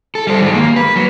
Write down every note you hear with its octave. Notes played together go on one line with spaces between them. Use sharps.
A4
G3 C5
D#3 G#3
A#3
B4
F#3